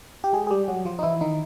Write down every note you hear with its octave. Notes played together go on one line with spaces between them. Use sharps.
G4
G#3 G#4
G#4
G3 G4
F#3 F#4
F3 F4
D#4
E3 E4
D#3 D#4